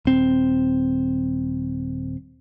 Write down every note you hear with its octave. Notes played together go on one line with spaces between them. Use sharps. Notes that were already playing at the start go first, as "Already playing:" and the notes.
D#1 C4